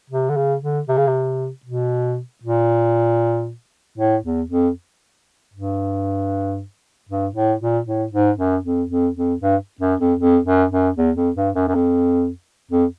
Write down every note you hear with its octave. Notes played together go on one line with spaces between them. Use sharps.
C3
D3
C#3
D3
C3
C#3
C3
B2
A#2
A2
E2
F2
G2
G2
A2
A#2
A2
G#2
F#2
F2
F2
F2
G2
F#2
F2
F2
F#2
F#2
E2
F2
G2
F#2
F#2
F2
F2